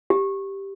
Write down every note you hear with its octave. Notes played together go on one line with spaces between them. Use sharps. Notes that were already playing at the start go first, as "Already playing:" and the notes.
G4